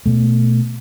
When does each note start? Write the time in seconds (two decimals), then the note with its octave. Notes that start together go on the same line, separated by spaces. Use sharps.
0.06 B2 A3